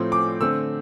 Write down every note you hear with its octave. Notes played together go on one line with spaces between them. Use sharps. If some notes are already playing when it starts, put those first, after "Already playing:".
Already playing: A2 F3 A3 C4 C6
D6
D3 A3 C4 E6